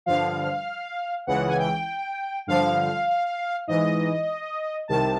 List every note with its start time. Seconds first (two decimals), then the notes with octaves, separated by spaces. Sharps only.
0.06 G2 D3 F3 F5
1.27 C#2 C#3 E3 F#5
1.48 G#5
1.57 G5
2.47 G2 D3 F3 F5
3.67 G#2 E3 D#5
4.88 C2 C3 D#3 A5